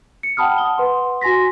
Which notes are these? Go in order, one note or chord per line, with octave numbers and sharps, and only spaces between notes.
C#7
F#5 G5 A5 B5 D#6 F6
F#5 D#6 G7
B4 F#5 C6
F#4 G#5 C6 A#6 B6